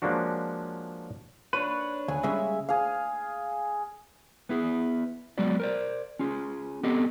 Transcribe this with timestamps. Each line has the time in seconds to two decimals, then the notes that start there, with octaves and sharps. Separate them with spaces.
0.02 F3 G#3 A#3 C#4 D4 F#4
1.53 D4 B4 C#5
2.08 D2 G#5
2.23 C#3 G3 G#3 E5
2.69 G#4 F5
4.49 B3 E4 G#4
5.38 F#3 G#3 B3 F#4 D5
5.60 A#4 C5 D5
6.19 C#4 F4 G#4
6.83 B3 C4 G4 A4 D#5